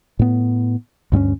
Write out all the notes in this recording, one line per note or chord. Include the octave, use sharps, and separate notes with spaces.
A2 B3
D2 G2 B3 C#4